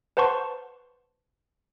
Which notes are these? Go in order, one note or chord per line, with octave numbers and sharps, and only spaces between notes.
B4 C5 F#5 A5 C6 C#6